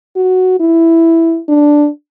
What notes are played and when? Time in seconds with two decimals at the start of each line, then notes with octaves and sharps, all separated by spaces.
0.16 F#4
0.60 E4
1.49 D4